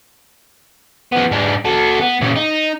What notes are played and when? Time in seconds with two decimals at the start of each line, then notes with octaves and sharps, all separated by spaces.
1.12 F3 B3
1.31 G#2 D4
1.65 F#4 A4
2.01 B3
2.21 A#2 C#3
2.36 D#4